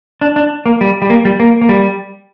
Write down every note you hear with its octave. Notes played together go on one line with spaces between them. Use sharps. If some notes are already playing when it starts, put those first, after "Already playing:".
D4
D4
A#3
G3
G3
A#3
G3
A#3
A#3
G3